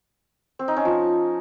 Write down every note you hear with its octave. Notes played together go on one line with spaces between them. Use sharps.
C4
D#4
C#4
F3